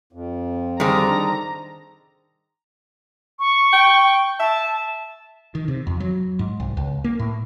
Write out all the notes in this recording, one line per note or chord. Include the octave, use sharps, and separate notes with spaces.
F2
D3 D#3 G3 G#4 C5 A#5
C#6
G5
E5 A5
D#3
C3
F2
F#3
G#2
C2
C#2
A#3
A2